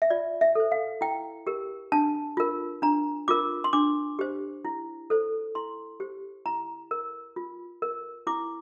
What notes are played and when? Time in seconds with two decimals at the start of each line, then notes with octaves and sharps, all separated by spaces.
0.02 E5
0.10 F4 D5
0.41 E5
0.55 A4 C5
0.72 F5
1.01 E4 G5
1.47 G4 A#4
1.92 D4 A5
2.37 F4 A#4
2.82 D4 A#5
3.28 F4 A#4 D6
3.64 C6
3.73 D4 D6
4.19 G4 C5
4.65 E4
5.10 A4 C5
5.55 E4 C6
6.00 G4 C5
6.46 E4 A#5
6.91 A#4
7.36 F4
7.82 A#4
8.27 E4 D6